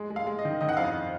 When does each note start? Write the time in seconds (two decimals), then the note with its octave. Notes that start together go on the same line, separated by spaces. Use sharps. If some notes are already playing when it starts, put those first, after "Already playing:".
Already playing: G#3
0.10 G#3
0.16 F5
0.27 G#3
0.39 D#5
0.45 D#3
0.61 D#3 D#5
0.69 F#5
0.77 F2 F5
0.84 D#5